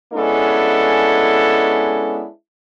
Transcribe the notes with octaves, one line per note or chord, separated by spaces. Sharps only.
G#3 B3 C#4 D4 E4 A4